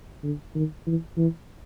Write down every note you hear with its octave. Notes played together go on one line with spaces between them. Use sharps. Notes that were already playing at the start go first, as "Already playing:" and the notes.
D3
D#3
E3
E3